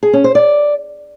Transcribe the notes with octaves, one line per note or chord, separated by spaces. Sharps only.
G#4
C#4
C5
D5